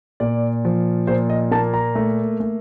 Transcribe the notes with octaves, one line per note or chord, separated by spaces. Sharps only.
A#2 D5
F3
A#2 C5
D#5
A#3 A5
A#5
A3
A3